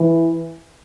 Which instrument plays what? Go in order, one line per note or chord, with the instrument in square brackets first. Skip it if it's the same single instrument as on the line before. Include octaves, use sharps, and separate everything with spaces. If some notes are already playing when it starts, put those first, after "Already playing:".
Already playing: [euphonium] E3